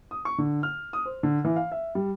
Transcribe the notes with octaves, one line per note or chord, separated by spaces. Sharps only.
D#6
C#6
D3
F6
D#6
C5
D3
E3
F5
E5
G3